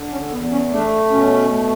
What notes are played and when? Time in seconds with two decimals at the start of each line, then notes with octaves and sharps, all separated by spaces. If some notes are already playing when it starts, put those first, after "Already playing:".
Already playing: D3
0.11 C#4
0.30 E2 B3
0.52 C#4
0.71 A3 D4
1.10 B2 C#4
1.50 A3